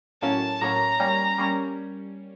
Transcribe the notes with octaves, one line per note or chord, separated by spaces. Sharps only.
A2 F#3 A#3 C#4 A5
A2 F#3 A#3 C#4 A#5
G3 A#3 C#4
G3 A#3 C#4